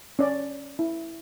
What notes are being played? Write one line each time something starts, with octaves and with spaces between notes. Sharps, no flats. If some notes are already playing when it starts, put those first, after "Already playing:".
C#4 D5
E4